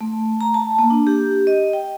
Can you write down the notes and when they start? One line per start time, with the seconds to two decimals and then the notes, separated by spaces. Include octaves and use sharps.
0.01 A3
0.41 A#5
0.54 A5
0.79 A#3
0.90 D4
1.07 G4
1.47 D#5
1.73 G5